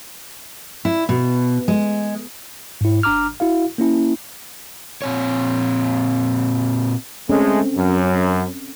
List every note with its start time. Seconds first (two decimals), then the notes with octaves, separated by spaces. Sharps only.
0.85 E4
1.09 B2
1.68 G#3
2.81 G#2 E4
3.03 G1 D4 A#5 D6 F6
3.40 E4 F#4 F5
3.78 A#3 C#4 E4
5.02 A#2 C4 C#5
7.30 G#3 A3 C4 C#4 A4
7.77 F#2